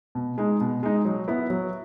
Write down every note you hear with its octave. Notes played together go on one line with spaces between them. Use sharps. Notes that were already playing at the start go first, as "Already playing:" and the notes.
B2
G#3 D#4
B2
G#3 D#4
F#3
B3 E4
F#3